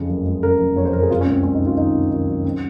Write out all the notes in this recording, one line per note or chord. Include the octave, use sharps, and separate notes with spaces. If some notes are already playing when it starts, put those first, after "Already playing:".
Already playing: F2 C#3
F#1
G#3
C#3 A#4
F#1
F2 C#5
C5
F#1 A#4
G#4
C3 F4
C#4
C#2
C4
C#2 C#4
D#4
C3
F4
D#3 D#4
C3
D#3
F#3
C#3 C4